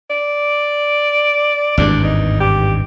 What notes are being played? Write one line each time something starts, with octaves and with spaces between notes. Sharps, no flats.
D5
G#1 E2 G2 D4
D#4
G4